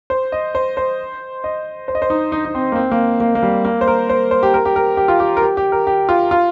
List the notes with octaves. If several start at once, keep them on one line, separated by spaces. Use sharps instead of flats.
C5
D#5
C5
C5
D#5
C5
D#5
C5
D#4
D#4
D#4
C4
A#3
C4
A#3
A#3
A#3
G3
A#3
C5
A#4
C5
C5
G4
A#4
G4
A#4
G4
F4
G4
A#4
G4
G4
A#4
G4
F4
F4